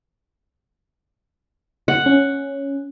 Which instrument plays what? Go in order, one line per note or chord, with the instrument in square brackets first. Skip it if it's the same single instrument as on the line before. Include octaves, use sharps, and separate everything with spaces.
[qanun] F#5
[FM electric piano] C#4